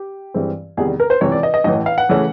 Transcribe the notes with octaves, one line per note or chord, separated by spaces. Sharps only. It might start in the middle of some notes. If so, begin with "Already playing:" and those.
Already playing: G4
G2 E3 G#3 C4
E2 C3 D#3 G3 G#4
A#4
C5
C#2 C3 E3 C#5
D5
D#5
D#5
A1 A2 E3 D#5
F5
F#5
C#3 E3 A3 C#4